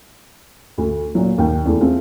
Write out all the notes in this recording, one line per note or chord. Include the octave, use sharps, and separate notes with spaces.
D2
A#2 F#3
D#2 G5
E2 A3
A3 C4 F4 G#4